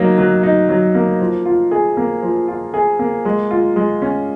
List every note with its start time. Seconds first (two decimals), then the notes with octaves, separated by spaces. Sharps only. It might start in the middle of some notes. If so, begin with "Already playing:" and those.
Already playing: F#3 A#3 D#4
0.18 F#3
0.43 D#4
0.69 F#3
0.95 A#3
1.20 F3
1.45 F4
1.71 G#4
1.97 A#3
2.22 F3
2.48 F4
2.74 G#4
2.99 A#3
3.25 G#3
3.51 F4
3.76 G#3
4.02 C#4